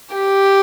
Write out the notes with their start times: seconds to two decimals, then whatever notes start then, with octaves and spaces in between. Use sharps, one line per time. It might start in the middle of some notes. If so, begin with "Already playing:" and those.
0.15 G4